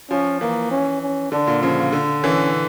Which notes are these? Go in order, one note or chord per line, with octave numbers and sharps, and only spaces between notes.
F3 C#4
E3 A#3
C#4
C#4
D3 D4
A#2
C#3 F3
D3
E3 C#4